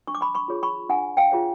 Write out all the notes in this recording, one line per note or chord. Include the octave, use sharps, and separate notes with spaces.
D4 C#6
D6
B5 C#6
B5 C#6
F4 G#4 C#5
B5 C#6
D4 F#5 G#5
F5 G5
F4 G#4 C#5